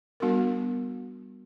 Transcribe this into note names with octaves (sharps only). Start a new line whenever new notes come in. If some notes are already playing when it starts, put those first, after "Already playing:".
G3 B3 D4 F#4 A#4